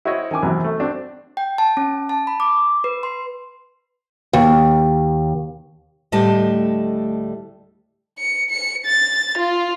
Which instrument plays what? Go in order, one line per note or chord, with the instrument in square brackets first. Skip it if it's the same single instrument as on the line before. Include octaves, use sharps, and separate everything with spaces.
[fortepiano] E4 F#4 C5 C#5 D#5
D#3 C#4 G#5 D6
A#1 E2 C3 F#3
A3
C4 D4 F#4
[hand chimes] G5
A5
C#4
A5
B5
D6
B4
C6
[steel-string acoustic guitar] D#2
D2 A2 G3 A3 D#5 A5
[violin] C#7
C#7
A6
F4